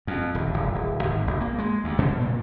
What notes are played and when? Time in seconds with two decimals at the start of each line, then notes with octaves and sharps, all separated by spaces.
0.07 F2
0.35 D#1
0.54 F1
0.75 D1
1.03 G#1
1.27 G#1
1.41 A#3
1.58 G#3
1.84 D2
1.99 B2
2.21 A#2